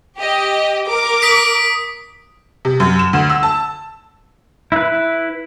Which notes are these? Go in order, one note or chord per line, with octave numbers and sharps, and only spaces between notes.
G4 D#5
A#4 D6
D#6 B6 D7
C3
F#2
E7
D2
E6
A5
E4 B4